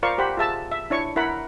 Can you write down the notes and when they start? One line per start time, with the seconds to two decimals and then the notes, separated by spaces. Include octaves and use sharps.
0.03 F4 A#4 C5 D5 F5 C#6
0.18 G4 C5 F#5 B5
0.37 F4 G#4 E5 A5 E6
0.72 E5
0.90 D4 E4 C#5 C#6
1.16 E4 A#4 F#5 B5